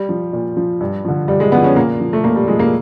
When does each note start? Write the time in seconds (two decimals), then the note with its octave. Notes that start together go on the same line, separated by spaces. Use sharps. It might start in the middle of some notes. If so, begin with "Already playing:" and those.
Already playing: G3
0.09 F3
0.33 A#2
0.57 F3
0.81 G2
1.05 D3 F3
1.28 G2 G3
1.40 G#3
1.52 D3 F3 B3
1.64 C#4
1.76 A#2 A#3
2.00 F3
2.13 A3
2.24 A#2 A#3
2.36 G3
2.48 F3 G#3
2.59 A#3